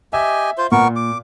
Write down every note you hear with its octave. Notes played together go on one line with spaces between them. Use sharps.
G4 D#5 E5 G#5
F4 C5
A#2 B3 A#4 C#6
D6